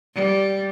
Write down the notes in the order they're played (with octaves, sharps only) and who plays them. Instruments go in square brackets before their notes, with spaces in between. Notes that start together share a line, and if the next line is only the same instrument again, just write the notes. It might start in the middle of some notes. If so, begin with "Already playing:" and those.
[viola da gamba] G3